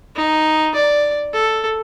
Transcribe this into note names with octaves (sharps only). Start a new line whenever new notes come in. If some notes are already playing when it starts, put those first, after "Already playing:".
D#4
D5
A4